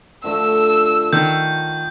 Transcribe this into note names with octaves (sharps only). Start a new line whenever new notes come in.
D3 F3 A3 E6
D#3 F4 F#5 C#6 G6